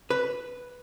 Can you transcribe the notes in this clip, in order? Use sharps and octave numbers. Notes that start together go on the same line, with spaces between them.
B4